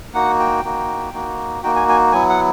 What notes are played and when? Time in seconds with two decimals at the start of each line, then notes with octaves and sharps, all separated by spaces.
0.14 A#3 D#4 F#4 F#5
0.39 G5
0.64 A#3 D#4 F#4
1.14 A#3 D#4 F#4
1.63 A#3 D#4 F#4 G5
1.76 G#5
1.89 G#5
2.12 F#3 B3 E4 G#5
2.29 F#5